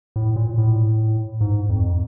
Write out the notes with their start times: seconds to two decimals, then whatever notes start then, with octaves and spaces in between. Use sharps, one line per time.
0.16 A2
0.36 A#2
0.58 A2
1.41 G#2
1.69 F2